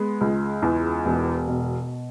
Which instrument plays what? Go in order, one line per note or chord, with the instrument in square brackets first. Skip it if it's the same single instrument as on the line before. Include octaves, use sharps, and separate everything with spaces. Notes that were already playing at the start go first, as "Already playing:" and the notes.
Already playing: [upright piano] G#3 B3
C#2
E2
E1
B2